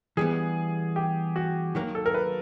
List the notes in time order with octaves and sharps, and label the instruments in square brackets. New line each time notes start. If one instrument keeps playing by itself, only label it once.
[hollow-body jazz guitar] E3 G3 B3 [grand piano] G#4
[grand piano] G4
F#4
[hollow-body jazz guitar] D#3 F#3 A#3
[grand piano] A4
A#4
B4